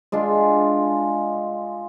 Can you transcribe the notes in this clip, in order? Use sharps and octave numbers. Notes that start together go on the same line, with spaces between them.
G#3 D4 F4